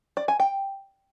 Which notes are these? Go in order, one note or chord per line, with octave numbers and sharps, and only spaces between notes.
D5
G#5
G5